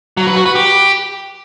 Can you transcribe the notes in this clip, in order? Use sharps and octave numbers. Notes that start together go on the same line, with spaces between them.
F#3
B4
F#4
B4
G4